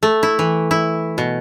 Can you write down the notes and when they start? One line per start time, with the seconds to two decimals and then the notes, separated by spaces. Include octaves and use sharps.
0.03 A3
0.23 E4
0.39 E3
0.71 E4
1.18 B2